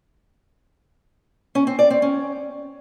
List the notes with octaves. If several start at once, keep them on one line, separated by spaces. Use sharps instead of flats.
C#4
C4
D5
C4
C#4